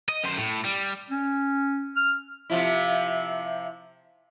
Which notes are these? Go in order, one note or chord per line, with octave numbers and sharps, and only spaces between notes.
D#5
F#2 C5
A2
G3
C#4
F6
C3 F3 E4